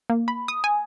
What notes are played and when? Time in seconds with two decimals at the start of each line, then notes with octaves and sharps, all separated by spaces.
0.10 A#3
0.28 B5
0.48 D#6
0.64 G#5